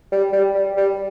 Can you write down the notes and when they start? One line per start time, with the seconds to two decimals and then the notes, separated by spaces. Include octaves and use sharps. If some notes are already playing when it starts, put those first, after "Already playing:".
0.12 G3
0.33 G3
0.55 G3
0.77 G3